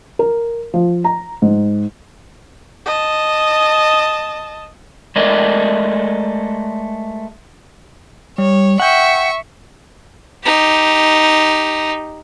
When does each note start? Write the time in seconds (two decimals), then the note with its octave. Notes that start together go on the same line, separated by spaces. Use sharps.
0.19 A#4
0.74 F3
1.04 A#5
1.42 G#2
2.86 D#5 A5
5.16 G#3 A3 A#4 D5 D#5
8.38 G3 C#5
8.80 E5 F#5 G5 C#6
10.44 D#4 G4